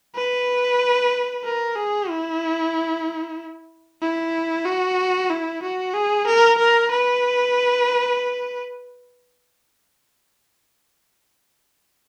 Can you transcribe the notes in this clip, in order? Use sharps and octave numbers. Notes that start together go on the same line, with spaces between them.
B4
A#4
G#4
E4
E4
F#4
E4
F#4
G#4
A#4
A#4
B4